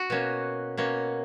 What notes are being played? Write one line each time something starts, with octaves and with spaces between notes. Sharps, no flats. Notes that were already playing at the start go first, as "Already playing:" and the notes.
Already playing: F#4
B2 A#3 C#4
B2 A#3 C#4